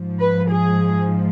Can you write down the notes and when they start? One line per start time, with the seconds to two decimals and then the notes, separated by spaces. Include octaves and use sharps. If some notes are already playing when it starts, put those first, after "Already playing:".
Already playing: G#2 F3
0.20 B4
0.50 G#4